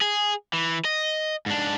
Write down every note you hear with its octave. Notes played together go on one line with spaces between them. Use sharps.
G#4
E3
D#5
G#2 D4